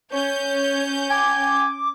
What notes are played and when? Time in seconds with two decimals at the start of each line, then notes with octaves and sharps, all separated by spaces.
0.12 C#4 C#5 G6
1.10 G#5 D6